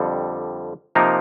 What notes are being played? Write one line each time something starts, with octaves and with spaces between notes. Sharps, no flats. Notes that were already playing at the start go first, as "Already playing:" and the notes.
Already playing: F2 D3 G3
C3 F3 A#3 D#4 A#4